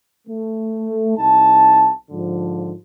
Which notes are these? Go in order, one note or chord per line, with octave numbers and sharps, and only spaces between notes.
A3
C2 D#4 A5
G#2 D3 F3